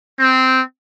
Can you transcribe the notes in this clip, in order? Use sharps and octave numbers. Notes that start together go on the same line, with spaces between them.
C4